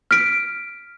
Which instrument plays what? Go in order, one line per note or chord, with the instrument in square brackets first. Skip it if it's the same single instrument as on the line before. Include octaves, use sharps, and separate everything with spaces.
[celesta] F6 B6 D7